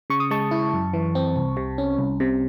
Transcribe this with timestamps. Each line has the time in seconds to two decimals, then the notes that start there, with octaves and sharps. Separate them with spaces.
0.10 C#3 C#6
0.20 D#6
0.31 G#3 A5 C#6
0.51 E4
0.73 F#2
0.94 E3
1.15 C4
1.36 C2
1.57 C3
1.78 C#4
1.98 C2
2.20 C3